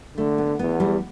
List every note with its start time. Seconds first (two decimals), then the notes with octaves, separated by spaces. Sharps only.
0.17 D3 A3
0.38 B3
0.59 E2 B3
0.80 G3